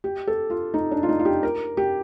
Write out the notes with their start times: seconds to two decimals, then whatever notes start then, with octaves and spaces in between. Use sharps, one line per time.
0.04 G4
0.27 A4
0.50 F4
0.74 D#4
0.91 D4
1.03 F4
1.09 D#4
1.19 F4
1.25 G4
1.43 A#4
1.77 G4